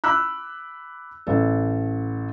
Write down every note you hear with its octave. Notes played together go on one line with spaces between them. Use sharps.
B5 D6 E6 F#6
A1 A4